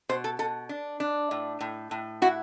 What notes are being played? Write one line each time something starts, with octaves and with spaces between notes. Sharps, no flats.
B2 C5
A4
B2 A4
D4
D4
A2
A2
A2
E4 F#4